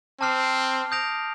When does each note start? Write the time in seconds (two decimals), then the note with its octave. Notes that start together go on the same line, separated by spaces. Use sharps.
0.21 C4 A5 D6 F6 C7 F7
0.92 D#6 G6 A#6 D7 F7